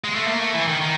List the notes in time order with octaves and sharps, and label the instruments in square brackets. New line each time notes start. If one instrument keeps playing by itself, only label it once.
[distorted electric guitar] G#3
A3
A#3
A3
E3
D#3
D#3